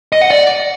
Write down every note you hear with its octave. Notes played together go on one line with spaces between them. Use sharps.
D#5
F#5
D5